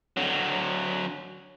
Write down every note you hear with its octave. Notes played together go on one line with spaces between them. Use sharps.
D3 F#3